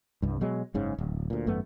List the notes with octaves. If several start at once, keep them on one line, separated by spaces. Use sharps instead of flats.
C2 G2
B2 F#3 G#3
F#1 G#2 C#3
D1
D2 A#2
G#1 F#2 A3 B3